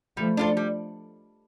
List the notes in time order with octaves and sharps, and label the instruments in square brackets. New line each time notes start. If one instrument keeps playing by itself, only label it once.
[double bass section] F3 A3 [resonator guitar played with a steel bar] G3
[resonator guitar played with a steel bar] D4 F4 A4
G3